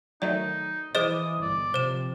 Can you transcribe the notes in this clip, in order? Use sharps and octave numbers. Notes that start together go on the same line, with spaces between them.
D#3 F#3 A3 D#4 D5
E3 G#4 C5 D#5 D6 D#6
G1 D5
C3 F3 C5 E7